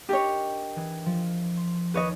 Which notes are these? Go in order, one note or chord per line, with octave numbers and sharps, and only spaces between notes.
D4 G4 A#4 C#5 D#5
E3 G#4
F3
C6
D#2 B4 C#5 D#5